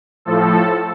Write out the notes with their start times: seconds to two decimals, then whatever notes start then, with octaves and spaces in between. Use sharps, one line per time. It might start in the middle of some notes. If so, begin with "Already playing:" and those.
0.25 A2 F3 A4